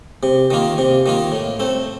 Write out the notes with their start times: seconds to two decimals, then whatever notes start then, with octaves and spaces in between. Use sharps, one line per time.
0.23 C3
0.50 D#3 A#3 F4
0.78 C3
1.06 D#3 A#3 F4
1.32 A2
1.60 A3 C4